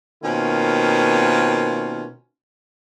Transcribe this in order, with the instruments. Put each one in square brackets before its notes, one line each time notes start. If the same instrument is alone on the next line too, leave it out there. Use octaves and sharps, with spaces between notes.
[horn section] B2 D#3 A#3 C4 C#4 F4